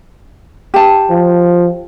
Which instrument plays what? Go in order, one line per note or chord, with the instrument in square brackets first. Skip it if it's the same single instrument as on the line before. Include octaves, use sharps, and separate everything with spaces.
[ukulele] G4 A5
[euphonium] F3